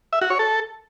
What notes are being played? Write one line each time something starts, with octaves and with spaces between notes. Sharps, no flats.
E5
F#4
C#5
A4